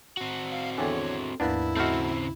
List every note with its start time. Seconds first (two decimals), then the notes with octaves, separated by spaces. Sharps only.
0.17 C4 F#4
0.51 F5
0.78 E2 D3 A4 C#5 G5 G#5
1.40 D#2 G#2 F3 A#3 B3 D4 E4
1.77 C#3 A3 C4 F#4 D#5 F6 G6